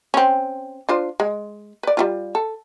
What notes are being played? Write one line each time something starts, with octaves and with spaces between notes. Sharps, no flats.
C4 C#4
D4 F4 C5
G#3
B4 D5
G3 E4 F4
A4